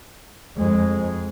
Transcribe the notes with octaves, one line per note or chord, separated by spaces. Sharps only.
F2 G#3